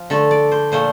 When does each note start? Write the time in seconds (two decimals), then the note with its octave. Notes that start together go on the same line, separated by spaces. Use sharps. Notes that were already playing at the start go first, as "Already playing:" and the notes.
Already playing: F3
0.10 D3 A3 A4
0.31 D5
0.52 C5
0.72 A#2 F3 A3 C5